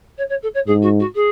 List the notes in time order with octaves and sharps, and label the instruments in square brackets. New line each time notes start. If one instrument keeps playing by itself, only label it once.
[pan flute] C#5
C#5
A4
C#5
[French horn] G#2 [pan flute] G#4
[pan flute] F#4
F#4
G#4